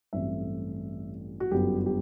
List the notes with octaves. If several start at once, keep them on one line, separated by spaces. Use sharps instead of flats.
A1 G2 F#3 A3 C4 E5
F#4
G1 F#2 F#3 B3 G4
G4